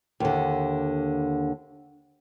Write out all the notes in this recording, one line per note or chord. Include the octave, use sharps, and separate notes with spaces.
D#2 D3